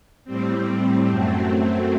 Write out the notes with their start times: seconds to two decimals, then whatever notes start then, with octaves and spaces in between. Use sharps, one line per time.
0.25 A2 G3 C4
1.08 F#2 F#3 A3 C4